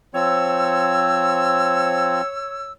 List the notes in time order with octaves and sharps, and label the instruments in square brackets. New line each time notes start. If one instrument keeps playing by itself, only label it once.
[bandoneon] F3 C4 [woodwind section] C#5 E6